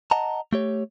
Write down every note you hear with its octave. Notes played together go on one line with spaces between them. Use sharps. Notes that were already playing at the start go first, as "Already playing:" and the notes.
D#5 F#5 A5 A#5
A3 G4 C#5